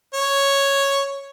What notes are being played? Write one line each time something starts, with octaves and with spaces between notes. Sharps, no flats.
C#5